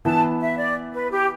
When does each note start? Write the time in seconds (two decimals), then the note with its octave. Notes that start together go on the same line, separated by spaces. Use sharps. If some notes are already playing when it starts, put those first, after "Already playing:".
0.05 E3 B3 E4 A5
0.41 E5
0.58 D5
0.93 B4
1.11 G4